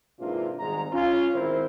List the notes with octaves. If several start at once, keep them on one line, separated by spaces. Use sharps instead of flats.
G#2 C3 E3 A#3 D4 F4
G#1 G#2 G3 G#3 A#5
C#4 F4
G#1 C4 E4 A#4 C5